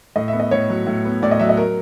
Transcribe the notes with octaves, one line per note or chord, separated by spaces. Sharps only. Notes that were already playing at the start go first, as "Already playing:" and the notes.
A2 D#5
E5
B3
D#5
A2 C#5
F#3
A2
B3
A2 D5
D#5
F#3 E5
D#5
A#4